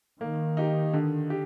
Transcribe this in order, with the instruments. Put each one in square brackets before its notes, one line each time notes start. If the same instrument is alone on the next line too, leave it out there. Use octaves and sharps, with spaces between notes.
[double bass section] D#3 [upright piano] A#3
[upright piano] D#4 G4
D3
G4